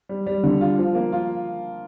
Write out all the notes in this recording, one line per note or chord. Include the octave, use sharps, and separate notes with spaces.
G3
G3
D3
F4
F3
A#3
F4